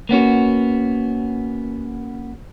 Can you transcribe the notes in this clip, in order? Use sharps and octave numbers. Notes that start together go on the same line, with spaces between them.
A#3 B3 C#4 F#4